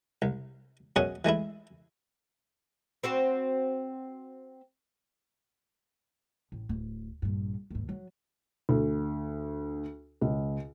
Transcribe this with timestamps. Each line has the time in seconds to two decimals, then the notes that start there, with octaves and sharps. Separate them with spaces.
0.22 C2
0.96 F#2 B2 C#4 G#4 F#5
1.25 E3 G#3 A3 E4
3.03 C4 F#4 C5
6.52 A1
6.69 D1
7.22 A#1 G2
7.70 D#2 G#2
7.89 F#3
8.69 D2
10.21 C#2